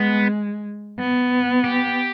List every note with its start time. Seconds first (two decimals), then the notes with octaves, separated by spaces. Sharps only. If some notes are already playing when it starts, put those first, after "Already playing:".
Already playing: G#3 B3
0.99 B3
1.64 G4